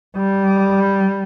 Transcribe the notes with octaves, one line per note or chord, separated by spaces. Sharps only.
G3